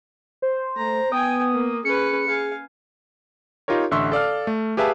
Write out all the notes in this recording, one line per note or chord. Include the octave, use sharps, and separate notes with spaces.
C5
A3 A#5
B3 G5 G#5 D#6
A#3
C#4 G#4 B4 C#7
G#4 F5 G#5
D#4 F4 G4 A#4 C#5
A1 D3 E5 C6 C#6 E6
A4 D5 F5 F6
A3
G4 G#4 B4 E5 F5 A5